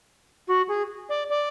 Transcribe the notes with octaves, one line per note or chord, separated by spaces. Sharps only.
F#4
G#4
D5
D5